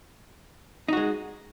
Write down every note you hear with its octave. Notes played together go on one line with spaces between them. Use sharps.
G#3 D#4 F#4